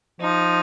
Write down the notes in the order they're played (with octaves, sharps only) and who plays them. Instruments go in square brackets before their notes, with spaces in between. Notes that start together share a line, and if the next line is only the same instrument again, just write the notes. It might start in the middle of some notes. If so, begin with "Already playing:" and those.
[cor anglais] F3 [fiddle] D#4